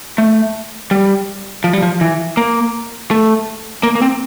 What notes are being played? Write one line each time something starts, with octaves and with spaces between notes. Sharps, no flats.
A3
G3
F3
G3
F3
E3
A#3
A3
A#3
A#3
C4